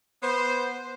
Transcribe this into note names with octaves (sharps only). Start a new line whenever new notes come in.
B3 C5